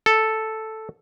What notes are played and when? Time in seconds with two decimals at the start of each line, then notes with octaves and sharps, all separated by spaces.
0.06 A4